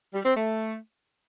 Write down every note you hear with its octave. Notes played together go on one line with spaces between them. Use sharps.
G3
C4
A3